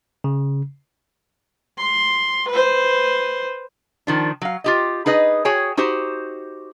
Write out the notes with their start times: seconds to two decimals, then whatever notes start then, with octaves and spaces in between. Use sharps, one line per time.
0.24 C#3
1.78 C6
2.49 B4 C5
4.07 D#3 F3 D4
4.42 F#3 F5
4.64 F4 G4 D#5
5.06 D#4 G#4 B4 D#5
5.45 F#4 G#4 C#5 G5 G#5
5.77 D#4 F#4 G4 C5